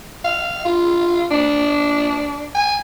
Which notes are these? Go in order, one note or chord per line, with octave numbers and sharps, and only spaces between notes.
F5
F4
D4
G#5